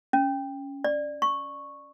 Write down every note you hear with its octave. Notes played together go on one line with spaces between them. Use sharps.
C#4
D5
C#6